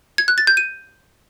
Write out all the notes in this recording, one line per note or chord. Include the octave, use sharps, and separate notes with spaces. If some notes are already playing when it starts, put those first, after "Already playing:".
G#6
F#6
A6
G6
D#7